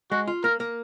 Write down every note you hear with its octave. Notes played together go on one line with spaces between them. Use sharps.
G#3 F#4
F4
A#3 A#4
A#3